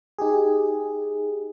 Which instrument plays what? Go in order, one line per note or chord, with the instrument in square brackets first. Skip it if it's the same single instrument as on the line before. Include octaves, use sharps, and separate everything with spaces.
[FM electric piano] D#4 G4 G#4